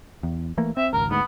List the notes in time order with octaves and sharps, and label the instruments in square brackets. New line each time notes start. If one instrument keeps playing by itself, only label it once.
[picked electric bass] E2
E3 A3 A#3
[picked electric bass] C4 [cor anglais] E5
[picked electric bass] G#1 C#2 [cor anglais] A#4
[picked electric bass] D2 G#2 [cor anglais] B3